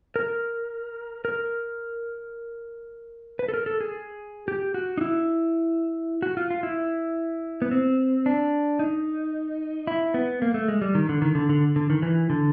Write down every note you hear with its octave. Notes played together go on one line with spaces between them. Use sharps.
A#4
A#4
B4
A4
A#4
A4
G#4
G4
F#4
D#4
E4
F#4
F4
F4
E4
B3
C4
D4
D#4
E4
B3
A#3
A3
G#3
G3
D#3
D3
D#3
D3
D3
D3
D#3
E3
D3